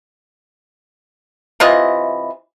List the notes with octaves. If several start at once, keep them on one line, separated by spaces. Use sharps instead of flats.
C3 E3 F4 D#5